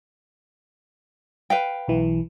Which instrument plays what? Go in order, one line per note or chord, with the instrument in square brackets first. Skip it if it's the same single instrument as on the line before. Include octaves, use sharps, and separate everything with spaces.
[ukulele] B4 F5 G5
[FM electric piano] B1 E3